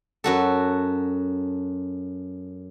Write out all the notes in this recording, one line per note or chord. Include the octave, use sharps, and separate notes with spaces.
F#2 F#4 A4